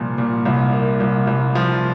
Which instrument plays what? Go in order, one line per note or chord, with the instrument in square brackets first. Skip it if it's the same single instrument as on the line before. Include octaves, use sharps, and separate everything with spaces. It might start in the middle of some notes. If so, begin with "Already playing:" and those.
Already playing: [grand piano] C2 A#2 F3
A#2
C2
A#3
C2
C2
F3